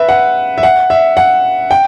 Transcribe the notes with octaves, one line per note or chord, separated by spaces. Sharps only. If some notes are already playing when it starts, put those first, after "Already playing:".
Already playing: B4 E5
F#5
E5
F#5
E5
F#5
G5